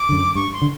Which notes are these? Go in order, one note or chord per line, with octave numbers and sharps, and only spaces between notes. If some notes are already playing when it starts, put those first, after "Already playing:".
Already playing: D6
F#2 D3
G2 C#6
C6
D3